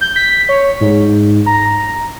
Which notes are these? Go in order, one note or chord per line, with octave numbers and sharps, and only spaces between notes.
G6
B6
C#5
G#2
A#5